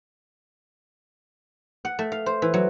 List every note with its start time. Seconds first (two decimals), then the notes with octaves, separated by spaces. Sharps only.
1.85 F#5
1.99 A3
2.12 F5
2.26 C5
2.42 E3
2.54 F#3